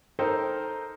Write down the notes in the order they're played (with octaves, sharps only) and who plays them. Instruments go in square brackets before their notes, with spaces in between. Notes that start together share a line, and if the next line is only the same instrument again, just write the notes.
[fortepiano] D#4 A4 A#4 C5 G5